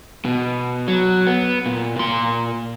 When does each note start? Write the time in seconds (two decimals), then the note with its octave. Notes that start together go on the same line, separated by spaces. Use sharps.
0.25 B2
0.88 F#3
1.27 B3
1.66 A#2
1.96 A#2 C6